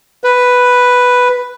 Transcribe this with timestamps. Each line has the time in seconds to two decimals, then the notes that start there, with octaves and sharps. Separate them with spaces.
0.24 B4